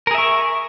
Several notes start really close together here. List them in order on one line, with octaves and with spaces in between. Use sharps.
A#4 G#4 E5 C#6